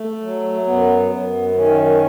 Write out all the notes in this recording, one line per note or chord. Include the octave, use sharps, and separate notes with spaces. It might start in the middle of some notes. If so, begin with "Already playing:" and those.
Already playing: A3
F#3
F#2 B3
F#2
D#3 C#4